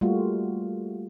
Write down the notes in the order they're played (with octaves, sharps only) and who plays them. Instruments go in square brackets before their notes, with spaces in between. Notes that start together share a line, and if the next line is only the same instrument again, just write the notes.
[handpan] G3 A3 A#3 F4 F#4